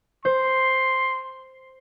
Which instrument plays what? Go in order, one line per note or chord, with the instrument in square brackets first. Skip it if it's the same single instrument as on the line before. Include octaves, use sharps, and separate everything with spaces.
[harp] C5 [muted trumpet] C6